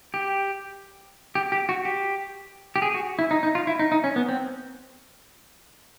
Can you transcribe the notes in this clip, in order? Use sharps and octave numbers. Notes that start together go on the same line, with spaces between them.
G4
G4
G4
F#4
G4
G4
G#4
F#4
E4
D#4
D#4
F4
E4
D#4
D#4
C#4
B3
C4